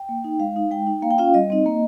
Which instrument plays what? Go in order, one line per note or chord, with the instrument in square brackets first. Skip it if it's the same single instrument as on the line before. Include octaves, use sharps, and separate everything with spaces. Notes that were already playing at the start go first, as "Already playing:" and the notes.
Already playing: [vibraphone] G5
A#3
D#4
G#3 F5
D#4
G#3 G5
D#4
A#3 F5
G5
C#4 F4 F5
G3 D#5
C4 D#4
A#3